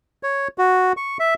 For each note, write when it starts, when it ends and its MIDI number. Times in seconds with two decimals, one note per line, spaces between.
0.23 0.48 73
0.58 0.93 66
0.97 1.18 85
1.20 1.34 76